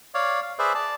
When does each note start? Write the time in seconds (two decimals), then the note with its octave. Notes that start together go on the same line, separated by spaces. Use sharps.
0.14 C#5 D5 F5
0.42 F5
0.59 G#4 B4 C5 D5 E5
0.75 D5 A5